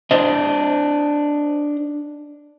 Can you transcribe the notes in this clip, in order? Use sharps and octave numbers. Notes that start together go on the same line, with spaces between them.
D4 C5 D#5